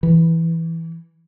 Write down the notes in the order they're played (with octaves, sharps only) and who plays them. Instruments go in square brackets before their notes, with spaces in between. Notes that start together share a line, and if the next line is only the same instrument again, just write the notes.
[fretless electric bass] E3